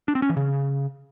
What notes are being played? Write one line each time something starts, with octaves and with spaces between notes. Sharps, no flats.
D4
C4
C#4
E3
C#3